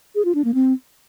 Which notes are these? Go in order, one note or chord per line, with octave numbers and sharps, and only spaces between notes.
G#4
F4
D4
A#3
C4